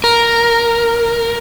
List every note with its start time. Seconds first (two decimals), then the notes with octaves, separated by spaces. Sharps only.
0.04 A#4